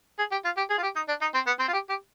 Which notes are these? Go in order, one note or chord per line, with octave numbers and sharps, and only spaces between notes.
G#4
G4
F4
G4
G#4
F4
G4
D#4
D4
D#4
C4
B3
C4
F4
G4
G4